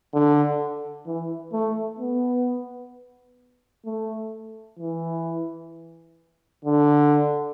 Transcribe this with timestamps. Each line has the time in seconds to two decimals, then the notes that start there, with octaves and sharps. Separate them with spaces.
0.14 D3
1.07 E3
1.53 A3
1.99 B3
3.86 A3
4.79 E3
6.65 D3